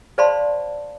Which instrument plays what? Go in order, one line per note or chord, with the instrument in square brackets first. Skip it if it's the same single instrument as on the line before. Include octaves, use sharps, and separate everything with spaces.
[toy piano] C5 D5 F5 A5 B5 C6